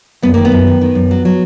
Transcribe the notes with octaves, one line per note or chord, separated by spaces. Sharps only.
F#2 B3
D#3 A#3
B3
F#2
D#3
D#3
F#2
F#3
F#3